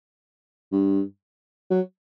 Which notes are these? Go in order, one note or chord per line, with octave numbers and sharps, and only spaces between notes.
G2
F#3